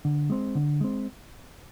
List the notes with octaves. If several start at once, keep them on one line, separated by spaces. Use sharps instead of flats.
D3
G#3 C4
D3
G#3 C4